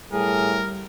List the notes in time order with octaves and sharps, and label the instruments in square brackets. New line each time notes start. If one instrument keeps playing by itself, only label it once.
[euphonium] A2 [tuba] G3 [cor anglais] G#4 [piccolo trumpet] A#4